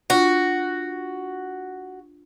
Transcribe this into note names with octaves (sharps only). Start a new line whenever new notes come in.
D4 F4 F#4